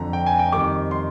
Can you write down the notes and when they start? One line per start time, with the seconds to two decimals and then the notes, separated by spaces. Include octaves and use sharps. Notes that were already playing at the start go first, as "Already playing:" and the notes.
Already playing: F2 D3 F3 A#5
0.13 G5
0.26 G#5
0.39 G5
0.52 F2 D#3 G3 D6
0.91 C6